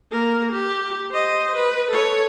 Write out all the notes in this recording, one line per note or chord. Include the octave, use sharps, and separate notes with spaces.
A#3 A#4
G4
C5 D#5
B4
A4 C#5